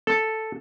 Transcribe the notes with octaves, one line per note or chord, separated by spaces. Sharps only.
A4